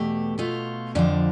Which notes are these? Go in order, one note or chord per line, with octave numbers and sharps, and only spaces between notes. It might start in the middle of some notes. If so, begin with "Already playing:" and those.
Already playing: E2 B2 A3 G4
B2 A3 F4
F2 D3 F3 D4